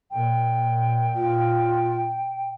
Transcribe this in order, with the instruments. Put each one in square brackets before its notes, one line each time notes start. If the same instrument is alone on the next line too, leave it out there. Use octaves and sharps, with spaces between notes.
[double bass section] A#2 [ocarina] G5
[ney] F4